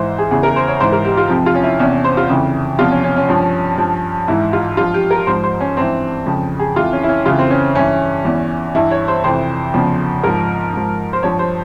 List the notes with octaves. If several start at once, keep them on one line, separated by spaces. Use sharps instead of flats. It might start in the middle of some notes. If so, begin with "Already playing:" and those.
Already playing: G#2 E3 C5
G#4
E2 C#3 E3 G#4
A#4
C5
C#5
G#2 E3 C5
A#4
G4
F4
F2 C3 F3
F4
C#4
E4
E2 C3 E3 C#4
C5
F4
F2 C#3 E3
E2 C3 F3 F4
C#4
C#4
C#4
G2 F3
G2 F3
G#2 E3 E4
F4
G2 F3 F4
G4
A#4
G#2 F3 C5
C5
C#4
G2 E3 C4
F2 C#3 F3
G#4
F2 E3 F4
C#4
E4
C#4
F2 C#3 E3 F4
C4
C#4
G2 E3 C#4
E2 E3
G2 E3 E4
C#5
C5
F2 C3 E3 C5
E2 C#3 F3
G#2 F3 A#4
G#2 F3
C5
G2 F3 C#5
C5